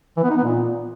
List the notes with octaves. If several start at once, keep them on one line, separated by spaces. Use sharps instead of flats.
E3
B3
D#4
B3
A#2